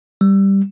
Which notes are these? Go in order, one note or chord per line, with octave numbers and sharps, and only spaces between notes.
G3